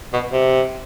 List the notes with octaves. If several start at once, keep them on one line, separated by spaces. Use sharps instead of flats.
B2
C3